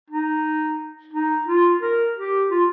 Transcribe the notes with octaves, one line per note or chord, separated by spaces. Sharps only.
D#4
D#4
F4
A#4
G4
F4